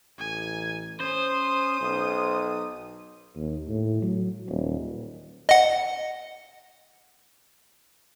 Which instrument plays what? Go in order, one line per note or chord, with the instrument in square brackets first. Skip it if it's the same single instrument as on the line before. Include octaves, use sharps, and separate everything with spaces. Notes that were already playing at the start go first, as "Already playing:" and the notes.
[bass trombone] A1 [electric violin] G#5
[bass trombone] C#4 [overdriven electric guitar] C5 [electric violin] D#6
[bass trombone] B1
[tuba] D#2
A2
F#3
D#1
[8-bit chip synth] D#5 F#5